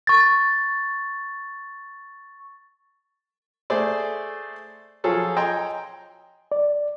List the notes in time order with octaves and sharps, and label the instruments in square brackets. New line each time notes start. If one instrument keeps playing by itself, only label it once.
[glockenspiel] C#6 A6
[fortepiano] A3 G#4 C5 D5
F3 F#3 F4 G#4 A4 C#5
D#5 G5 G#5 A#5 C6
[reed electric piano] D5